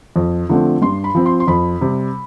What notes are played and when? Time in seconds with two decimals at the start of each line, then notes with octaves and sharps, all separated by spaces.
0.16 F2
0.49 D3 F3 A3 C4
0.82 G2 C6
1.04 B5
1.15 F3 C4
1.26 C6
1.40 C6
1.47 F2 B5
1.81 C3 G3